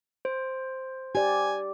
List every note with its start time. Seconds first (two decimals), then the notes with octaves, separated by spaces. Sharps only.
0.25 C5
1.15 G4 D5 G#5